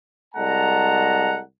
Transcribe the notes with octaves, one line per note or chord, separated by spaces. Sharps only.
C2 G#3 F#5 A5 A#5